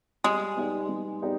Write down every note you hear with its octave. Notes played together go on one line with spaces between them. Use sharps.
G3 G#3
B3 D#4 G4 D5
G3
B3 D#4 G4 D5